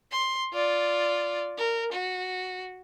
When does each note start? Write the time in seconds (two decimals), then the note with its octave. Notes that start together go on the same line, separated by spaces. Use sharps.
0.11 C6
0.53 F4 D5
1.58 A#4
1.92 F#4